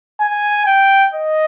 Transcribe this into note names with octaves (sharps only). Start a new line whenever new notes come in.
G#5
G5
D#5